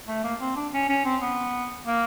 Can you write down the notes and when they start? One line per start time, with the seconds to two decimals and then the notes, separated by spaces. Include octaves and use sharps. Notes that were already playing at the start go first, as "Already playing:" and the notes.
0.08 A3
0.24 A#3
0.41 C4
0.56 D4
0.73 C#4
0.89 C#4
1.05 C4
1.22 B3
1.87 A#3